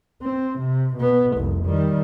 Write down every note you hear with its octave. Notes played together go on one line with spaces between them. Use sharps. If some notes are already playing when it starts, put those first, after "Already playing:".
C4
C3
B2 B3
F1 C2
D#3 G3